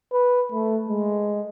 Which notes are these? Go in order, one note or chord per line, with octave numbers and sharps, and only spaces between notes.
B4
A3
G#3